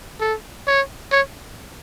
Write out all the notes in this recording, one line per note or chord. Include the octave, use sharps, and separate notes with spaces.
A4
C#5
C#5